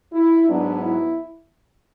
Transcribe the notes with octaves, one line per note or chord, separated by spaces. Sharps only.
E4
G#2 F#3 B3 D4
E4